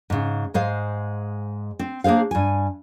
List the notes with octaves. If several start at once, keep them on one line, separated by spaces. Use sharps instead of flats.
G#2 C#3
G#2 G#3 C5 F5
C4
A#3 D4 G#4 C5 F5
G2 G#5